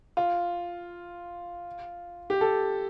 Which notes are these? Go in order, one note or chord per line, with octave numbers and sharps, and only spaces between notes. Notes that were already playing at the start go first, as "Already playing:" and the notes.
F4
G4
A4